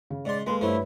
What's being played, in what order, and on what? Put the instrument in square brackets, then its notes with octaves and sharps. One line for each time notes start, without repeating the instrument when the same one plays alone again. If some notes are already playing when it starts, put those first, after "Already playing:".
[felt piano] C#3
[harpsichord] G#2 C6 [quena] D5
[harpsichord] G#3 [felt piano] A#3 A4 B4 [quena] C6
[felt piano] G2 B4 C#5 [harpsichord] F3 A3 [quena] E4